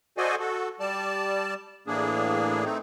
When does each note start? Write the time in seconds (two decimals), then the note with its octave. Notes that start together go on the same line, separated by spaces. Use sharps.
0.18 F#4 A4 C5 D5 D#5 G#5
0.40 F#4 A4
0.80 G3 D5 A5
1.87 A2 E3 A#3 D4 G#4
2.65 A3 C4 D#4